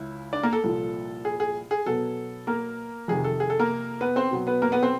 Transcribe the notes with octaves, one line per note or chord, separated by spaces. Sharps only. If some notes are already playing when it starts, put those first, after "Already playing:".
Already playing: C#2 C#3 E4
D4 D5
A#3 A#4
A4
C2 A#2 F3
G#4
G#4
G#4
B2 F#3 B3 A4
A#3 A#4
F2 C3 D#3 G#4
A4
G#4
A4
A#3 A#4
B3 B4
C4 C5
B2 F#3 B3
B3 B4
A#3 A#4
B3 B4
C4 C5